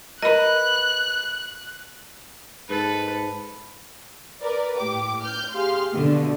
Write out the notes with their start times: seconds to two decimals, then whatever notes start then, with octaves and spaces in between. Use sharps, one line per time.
0.23 A#4 B4 D#5 B5 F#6
2.69 G#2 A4 B4
4.40 A#4 B4 D5
4.77 A2 G4 D6
5.22 F6 G6
5.53 G4 G#4 F5 C6 F6
5.93 B2 D3 A3 B3